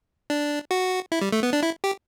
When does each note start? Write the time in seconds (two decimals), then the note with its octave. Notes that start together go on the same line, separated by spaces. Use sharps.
0.30 D4
0.71 F#4
1.12 E4
1.21 G3
1.32 A3
1.43 B3
1.53 D4
1.63 E4
1.84 G4